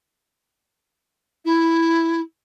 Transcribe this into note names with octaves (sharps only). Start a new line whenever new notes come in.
E4